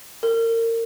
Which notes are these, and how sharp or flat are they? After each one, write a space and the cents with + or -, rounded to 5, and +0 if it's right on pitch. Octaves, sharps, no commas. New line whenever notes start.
A#4 -30